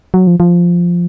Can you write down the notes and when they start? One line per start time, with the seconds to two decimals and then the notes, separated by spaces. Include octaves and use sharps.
0.14 F#3
0.27 F3
0.40 F3